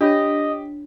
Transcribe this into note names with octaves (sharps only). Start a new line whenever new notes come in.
D4 F4 G4 C#5 D#5